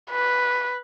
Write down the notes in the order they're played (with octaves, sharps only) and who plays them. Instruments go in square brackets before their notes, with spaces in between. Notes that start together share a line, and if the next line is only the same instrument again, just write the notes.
[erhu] B4